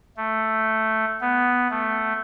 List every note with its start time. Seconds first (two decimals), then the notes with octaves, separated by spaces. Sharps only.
0.17 A3
1.21 B3
1.71 A3